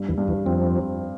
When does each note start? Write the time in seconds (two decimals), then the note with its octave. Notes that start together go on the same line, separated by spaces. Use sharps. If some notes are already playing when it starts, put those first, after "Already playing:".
Already playing: G2
0.08 E2 E3
0.18 G2
0.28 E2 E3
0.46 F2 F3 C4